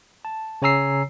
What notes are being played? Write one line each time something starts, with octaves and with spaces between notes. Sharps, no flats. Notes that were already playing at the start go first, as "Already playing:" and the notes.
A5
C#3 C#5 G#5 A#5 E6 C7